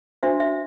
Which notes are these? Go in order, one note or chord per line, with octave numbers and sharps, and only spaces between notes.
D4 F#4 C5 E5
E5